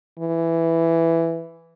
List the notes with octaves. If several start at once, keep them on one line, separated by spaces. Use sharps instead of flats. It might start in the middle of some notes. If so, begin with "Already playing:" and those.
E3